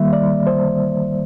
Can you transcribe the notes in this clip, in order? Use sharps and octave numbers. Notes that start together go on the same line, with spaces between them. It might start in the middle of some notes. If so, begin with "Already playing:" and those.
Already playing: D#3 G3 A#3 E5
D5
C5